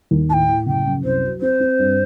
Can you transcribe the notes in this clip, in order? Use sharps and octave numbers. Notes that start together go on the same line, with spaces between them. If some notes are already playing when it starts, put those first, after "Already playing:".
D#2
A2 G5 A5
A2
F#1 G5
F#2
C2 C5
F#3
C4 C5
C4
G2